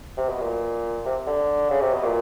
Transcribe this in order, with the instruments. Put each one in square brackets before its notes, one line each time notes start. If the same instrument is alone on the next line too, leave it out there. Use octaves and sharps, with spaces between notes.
[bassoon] C3
B2
A#2
C3
D3
C#3
C3
B2
A#2